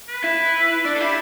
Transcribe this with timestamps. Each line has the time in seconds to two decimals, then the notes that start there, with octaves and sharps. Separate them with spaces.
0.08 B4
0.24 E4
0.85 D4 D5
0.94 A4
1.00 E4 G4